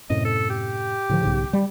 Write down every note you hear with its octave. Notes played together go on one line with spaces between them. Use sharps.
F#2 A2 C3 D#5
A4
G4
A2 D3 F3
B1 G#2 C#3
G3